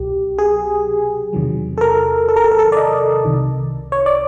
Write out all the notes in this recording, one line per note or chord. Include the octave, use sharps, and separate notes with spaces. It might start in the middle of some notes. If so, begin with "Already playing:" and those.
Already playing: C2 B2 F#3 G4
G#4
E2 C3 D#3 F#3
A4
A#4
A4
A#4
A4
A#4
A4
D5
D#5
C2 C3 D#3
C#5
D5